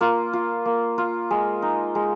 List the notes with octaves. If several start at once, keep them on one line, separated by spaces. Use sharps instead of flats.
A#3 F4
F4
A#3
F4
G#3
D#4
G#3